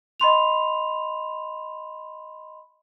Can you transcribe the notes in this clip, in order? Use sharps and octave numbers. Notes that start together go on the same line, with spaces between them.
D#5 B5 C6 F7